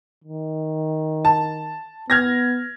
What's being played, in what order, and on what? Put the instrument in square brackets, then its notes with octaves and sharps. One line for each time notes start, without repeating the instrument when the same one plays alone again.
[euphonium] D#3
[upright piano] A5
[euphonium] B3 [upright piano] F6 G#6 A#6